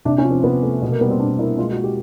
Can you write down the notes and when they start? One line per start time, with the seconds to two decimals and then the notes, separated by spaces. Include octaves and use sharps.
0.05 C3 D4
0.18 C#4
0.24 F3
0.31 C4
0.44 C3 B3
0.63 A3
0.82 B2 B3
0.92 A#3
1.01 G3 B3
1.10 C4
1.20 B2 D4
1.39 A#3 E4
1.58 G#3 F4
1.71 F#4
1.77 G#3
1.84 G4